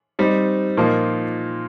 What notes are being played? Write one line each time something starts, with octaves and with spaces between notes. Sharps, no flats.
G3 C4 D#4
A#2 F3 A#3 D#4